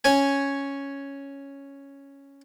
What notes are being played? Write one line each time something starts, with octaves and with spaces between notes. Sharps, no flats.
C#4 C#5 G#5